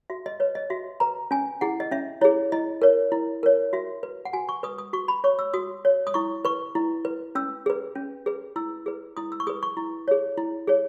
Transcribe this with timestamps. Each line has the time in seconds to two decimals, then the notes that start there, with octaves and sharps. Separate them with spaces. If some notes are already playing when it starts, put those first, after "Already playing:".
0.10 F#4 E5
0.26 D#5
0.40 B4 C#5
0.55 D#5
0.70 F#4 E5
1.00 B4 A#5
1.31 C#4 G#5
1.61 E4 G#4 F#5
1.80 D#5
1.91 C#4 E5
2.21 E4 G#4 C#5
2.52 E4 D#5
2.82 A#4 C#5
3.12 E4
3.43 A#4 C#5
3.73 F#4 E5
4.03 B4
4.25 F#5
4.33 F#4 G#5
4.49 C#6
4.63 B4 D#6
4.78 D#6
4.93 F#4 C#6
5.08 B5
5.24 C#5 C#6
5.39 E6
5.54 F#4 D#6
5.85 C#5
6.07 D#6
6.14 E4 C#6
6.45 B4 C#6
6.75 E4
7.05 B4
7.35 C#4 E6
7.66 G#4 B4
7.95 C#4
8.26 G#4 B4
8.56 E4 E6
8.86 G#4 B4
9.17 E4 D#6
9.32 E6
9.40 C#6
9.47 G#4 D#6
9.50 B4
9.63 C#6
9.77 E4
10.08 G#4 C#5
10.38 E4
10.67 G#4 C#5